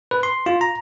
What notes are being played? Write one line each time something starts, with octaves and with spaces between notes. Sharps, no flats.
B4
C6
F4
A#5